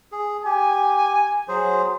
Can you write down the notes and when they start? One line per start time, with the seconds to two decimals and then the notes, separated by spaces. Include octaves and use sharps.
0.12 G#4
0.45 G4 G#5
1.48 F#3 G#4 C5